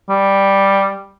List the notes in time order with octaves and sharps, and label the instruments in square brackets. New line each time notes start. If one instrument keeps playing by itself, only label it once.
[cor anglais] G3